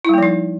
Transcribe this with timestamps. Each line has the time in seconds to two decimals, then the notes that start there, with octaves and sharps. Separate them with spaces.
0.05 E4
0.09 G3
0.14 A#3
0.18 F3
0.23 D#4